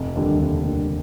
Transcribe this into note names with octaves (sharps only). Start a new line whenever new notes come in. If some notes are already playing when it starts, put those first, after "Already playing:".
Already playing: F1
D#2 D3 G3
F1
D#2 D3 G3